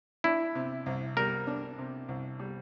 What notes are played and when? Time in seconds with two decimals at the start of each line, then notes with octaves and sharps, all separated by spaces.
0.24 D4 E4
0.55 C3
0.86 C2
1.17 G3 A#4
1.47 D4
1.78 C3
2.08 C2
2.39 G3